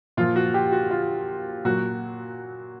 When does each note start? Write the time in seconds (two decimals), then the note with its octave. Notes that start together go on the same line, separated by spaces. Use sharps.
0.17 A#2 F3 F4
0.36 F#4
0.54 G4
0.72 F#4
0.91 F4
1.65 A#2 F#3 F#4